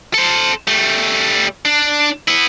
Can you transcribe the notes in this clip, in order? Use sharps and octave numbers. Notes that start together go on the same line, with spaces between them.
A4 C5
G3 A3
D4
B3 E4